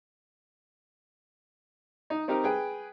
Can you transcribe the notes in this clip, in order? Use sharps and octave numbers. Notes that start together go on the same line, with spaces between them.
D#4
C4 D#4 G4 A#4
G#4 B4 G5